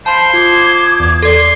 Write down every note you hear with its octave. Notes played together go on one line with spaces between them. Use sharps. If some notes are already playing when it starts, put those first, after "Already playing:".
C5 F5 A5 B5 C6
F4 D6 D#6 G#6
E2
A4 D5 C6